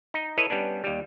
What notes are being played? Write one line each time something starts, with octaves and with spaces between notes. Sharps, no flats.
D#4
E4 A4 B4 C#5 D#5
G3 B3 C#4 D4
D#2 G3